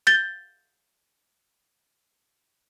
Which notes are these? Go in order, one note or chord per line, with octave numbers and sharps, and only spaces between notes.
G6 A6 G7